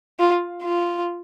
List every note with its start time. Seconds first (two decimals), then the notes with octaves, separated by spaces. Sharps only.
0.19 F4
0.63 F4